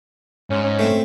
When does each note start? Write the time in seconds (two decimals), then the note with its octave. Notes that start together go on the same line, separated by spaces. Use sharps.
0.50 G#2 C#4
0.64 C#4
0.79 A3 C4